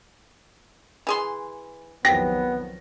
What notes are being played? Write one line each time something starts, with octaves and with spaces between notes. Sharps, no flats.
E3 G#4 C6
B1 F2 D#3 B3 G4 A#6